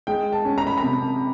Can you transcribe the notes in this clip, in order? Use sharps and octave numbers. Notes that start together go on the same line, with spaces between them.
G#3 G5
A5
C#4
A#5
B5
A#5
C3